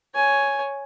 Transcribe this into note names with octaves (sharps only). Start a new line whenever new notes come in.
C#5 G#5